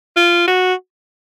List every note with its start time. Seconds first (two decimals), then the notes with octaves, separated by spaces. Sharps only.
0.16 F4
0.47 F#4